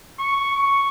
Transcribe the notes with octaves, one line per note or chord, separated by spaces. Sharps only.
C#6
C#6